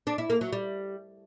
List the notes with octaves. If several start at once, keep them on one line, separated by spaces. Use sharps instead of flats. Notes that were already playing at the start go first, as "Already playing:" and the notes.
D4
E4
A#3
F#3
G3